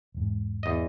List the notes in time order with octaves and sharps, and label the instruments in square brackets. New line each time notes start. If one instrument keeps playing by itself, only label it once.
[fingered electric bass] E1 G#2
[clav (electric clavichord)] E2 D#5